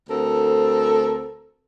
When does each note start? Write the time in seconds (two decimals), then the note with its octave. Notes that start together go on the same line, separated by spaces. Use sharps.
0.09 D2 C4 A4 A#4